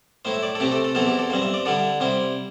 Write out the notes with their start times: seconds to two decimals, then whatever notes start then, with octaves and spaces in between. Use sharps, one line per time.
0.25 A2 A3 E4 C5
0.34 E5
0.43 D5
0.55 A4
0.60 C3 A3 C4 G4
0.72 A4
0.84 A4
0.95 E2 E3 C4 E4 A4
1.07 G4
1.19 A4
1.30 G2 G3 C4 C5
1.42 E5
1.54 D5
1.65 D3 G3 E4 A4
2.00 C3 G3 E4 C5